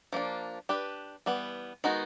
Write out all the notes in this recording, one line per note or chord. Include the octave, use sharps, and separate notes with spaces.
F3 A#3 D4
D4 G4 B4
E3 G3 B3
D#3 G#3 B3 D#4 F#4